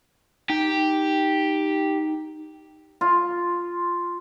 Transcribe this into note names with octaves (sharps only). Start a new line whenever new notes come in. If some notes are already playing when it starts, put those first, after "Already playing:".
D#4 G4
F4